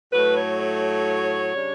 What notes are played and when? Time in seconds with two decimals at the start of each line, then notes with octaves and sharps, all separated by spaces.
0.12 A2 F#3 A3 B4
0.36 C#5
0.59 C#5
1.53 C#3 G3 D4